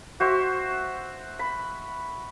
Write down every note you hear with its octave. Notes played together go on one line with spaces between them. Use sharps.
F#4 C5 E5
B5